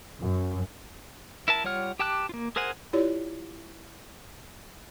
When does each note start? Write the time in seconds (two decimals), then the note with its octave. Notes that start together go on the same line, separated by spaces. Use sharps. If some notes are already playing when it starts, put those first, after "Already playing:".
0.21 F#2
1.48 E4 A#4 A5
1.64 G3 F4 C#5 F#5 F6
1.99 G4 G5 A5 D6 F#6
2.29 A#3 F4
2.56 G#4 A#4 C5 F#5 G#5
2.93 E4 F4 G4 C#5 D5